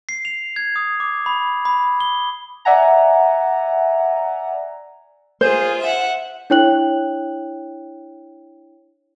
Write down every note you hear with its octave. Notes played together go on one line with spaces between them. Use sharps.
C7
F7
G#6
D#6
D6
B5
B5
G7
D5 E5 F#5 G#5 A#5
F4 G#4 C5
E5 F#5
D4 E4 C#5 G5 F#6 F#7